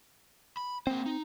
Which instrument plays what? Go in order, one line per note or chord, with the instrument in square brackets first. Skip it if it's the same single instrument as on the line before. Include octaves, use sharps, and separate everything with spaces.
[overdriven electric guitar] B5
[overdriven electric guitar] A#3 C5 [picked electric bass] C4
[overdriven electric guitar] D#4